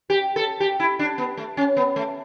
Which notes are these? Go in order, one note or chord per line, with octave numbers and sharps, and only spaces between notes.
G4
A4
G4
E4
D4
B3
A3
C#4
B3
A3